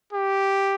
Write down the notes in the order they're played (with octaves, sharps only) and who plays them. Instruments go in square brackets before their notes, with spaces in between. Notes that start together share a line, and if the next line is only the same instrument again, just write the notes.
[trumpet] G4